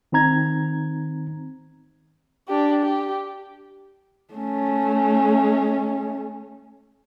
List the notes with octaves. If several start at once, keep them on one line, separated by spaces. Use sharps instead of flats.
D#3 C4 D#4 A#5 G#6
D4 G4
G4
A3 C#4